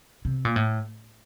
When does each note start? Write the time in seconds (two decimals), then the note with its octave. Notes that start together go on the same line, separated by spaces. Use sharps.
0.25 C3
0.45 A#2
0.56 A2